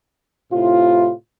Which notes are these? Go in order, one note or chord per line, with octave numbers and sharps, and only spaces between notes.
A2 C3 E4 F4